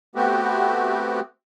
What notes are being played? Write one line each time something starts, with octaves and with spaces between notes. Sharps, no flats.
A3 B3 C4 F#4 G4